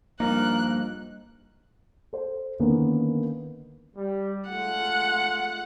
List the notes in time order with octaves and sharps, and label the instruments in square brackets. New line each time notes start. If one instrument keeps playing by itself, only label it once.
[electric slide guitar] G2 F3 D#4 [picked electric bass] A#3 [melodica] A#4 [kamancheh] F#6
[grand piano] A4 C5
D3 D#3 A#3 B3 C#4
[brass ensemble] G3
[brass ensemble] G#3 A3 F4 [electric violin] F#5